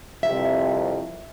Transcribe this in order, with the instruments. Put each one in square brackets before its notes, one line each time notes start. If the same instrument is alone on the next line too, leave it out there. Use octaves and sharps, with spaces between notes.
[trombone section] C2 F2 C3 [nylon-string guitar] E5